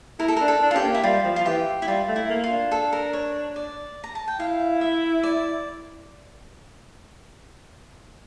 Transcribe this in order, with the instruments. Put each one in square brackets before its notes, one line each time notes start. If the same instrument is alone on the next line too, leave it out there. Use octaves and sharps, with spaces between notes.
[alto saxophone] E4 [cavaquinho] A#4
[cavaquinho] A4
[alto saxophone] D4 [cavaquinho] A#4
[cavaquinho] A4
[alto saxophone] D4
[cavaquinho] F4
[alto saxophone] C#4 [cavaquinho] G4
[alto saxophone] A#3
[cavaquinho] E4
[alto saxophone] G3 [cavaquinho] F4
[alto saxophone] F3
[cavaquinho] F4
[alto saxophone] E3 [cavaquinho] G4
[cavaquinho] E4
[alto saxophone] G3 [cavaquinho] F4
[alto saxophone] A3
[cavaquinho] E4
[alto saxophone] A#3
[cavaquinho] F4
[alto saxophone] D4
[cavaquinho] A4
A#4
C#5
D5
A#5
A5
G5
[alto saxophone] E4 [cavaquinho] F5
[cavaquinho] E5
D5